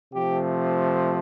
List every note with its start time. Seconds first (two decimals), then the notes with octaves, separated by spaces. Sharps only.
0.14 C3 F3 A3 G4